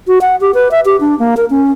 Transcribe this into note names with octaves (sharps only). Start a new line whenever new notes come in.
F#4
F#5
G4
B4
E5
G4
D4
A#3
A#4
C#4